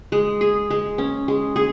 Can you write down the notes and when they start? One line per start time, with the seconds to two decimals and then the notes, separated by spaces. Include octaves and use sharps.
0.12 G#3
0.41 G#4
0.70 G#3
0.98 C#4
1.28 G#3
1.56 G#4